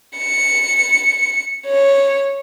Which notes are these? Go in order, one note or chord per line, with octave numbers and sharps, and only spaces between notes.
C#7
C#5